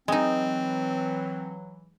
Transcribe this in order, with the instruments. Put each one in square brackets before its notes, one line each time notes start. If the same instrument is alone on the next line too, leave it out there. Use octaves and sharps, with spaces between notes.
[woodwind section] E3 F#3 [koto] G#3 D#4 [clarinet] C4